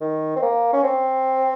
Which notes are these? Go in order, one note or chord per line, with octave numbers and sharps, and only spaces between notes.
D#3
C4
A#3
C#4
C4